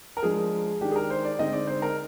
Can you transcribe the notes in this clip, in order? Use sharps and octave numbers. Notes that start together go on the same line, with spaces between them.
A#4
F3 G#3 D4 G#4
D#3 G#3 D4 G4
G#4
A#4
C5
D5
D3 G#3 C4 D#4 D#5
D5
C5
A#4